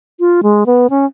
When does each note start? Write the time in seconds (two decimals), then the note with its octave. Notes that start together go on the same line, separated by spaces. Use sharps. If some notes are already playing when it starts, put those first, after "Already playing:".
0.20 F4
0.43 G#3
0.66 B3
0.90 C#4